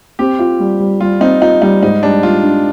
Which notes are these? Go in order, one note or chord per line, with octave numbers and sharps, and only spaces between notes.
C4 G4
F4
G3
G3
G3 F4
C4 D#4
D#4 F4
G3 D#4
G#2 D#4
G3 D4
G3 F4
D4